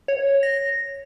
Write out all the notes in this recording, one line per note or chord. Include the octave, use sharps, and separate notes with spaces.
C#5
A#6